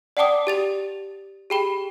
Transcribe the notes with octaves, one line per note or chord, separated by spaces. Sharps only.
D5 F#5 G5 A5 D6 D#6
G4 A6 F7
G4 G#4 G5 B5 G7